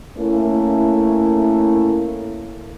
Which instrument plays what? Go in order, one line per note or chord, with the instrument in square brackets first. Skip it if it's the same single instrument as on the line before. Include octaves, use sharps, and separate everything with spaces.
[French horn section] A3 A#3 C#4 E4